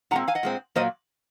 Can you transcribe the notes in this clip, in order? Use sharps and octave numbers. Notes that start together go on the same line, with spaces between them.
A#2 G#3 C4 F#5 A#5
F5 G#5
D#5 F#5
A#2 G#3 C4
A#2 F#3 A#3 C5 D#5